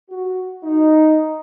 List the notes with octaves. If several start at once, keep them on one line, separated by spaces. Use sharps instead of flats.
F#4
D#4